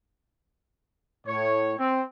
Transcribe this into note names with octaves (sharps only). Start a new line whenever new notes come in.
A2 C#5
C4